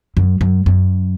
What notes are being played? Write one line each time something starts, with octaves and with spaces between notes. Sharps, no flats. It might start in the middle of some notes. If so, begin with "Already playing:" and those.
F#2
F#2
F#2